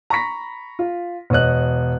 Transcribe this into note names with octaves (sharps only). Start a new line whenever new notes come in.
A#5 B5 C#6 A#6 B6
F4
E1 C#5 D#5 F#6